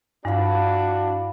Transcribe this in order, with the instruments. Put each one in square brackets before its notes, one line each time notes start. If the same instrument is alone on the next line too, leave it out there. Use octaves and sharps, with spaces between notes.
[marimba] G2 [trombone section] D4 F#4 [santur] E4 F5 B5